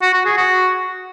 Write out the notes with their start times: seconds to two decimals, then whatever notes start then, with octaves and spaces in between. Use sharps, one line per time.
0.02 F#4
0.14 F#4
0.25 G#4
0.37 F#4